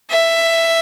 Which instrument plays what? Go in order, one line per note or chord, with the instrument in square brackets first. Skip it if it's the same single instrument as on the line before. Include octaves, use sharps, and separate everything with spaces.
[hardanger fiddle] E5